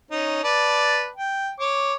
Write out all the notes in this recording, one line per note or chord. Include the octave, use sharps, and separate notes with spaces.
C#4 D#4
B4 D5 A5
G5
C#5 D6